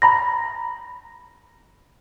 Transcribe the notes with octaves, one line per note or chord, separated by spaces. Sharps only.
A#5 B5 A#6